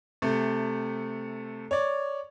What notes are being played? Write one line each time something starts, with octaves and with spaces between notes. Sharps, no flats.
C3 A3
C#5 D5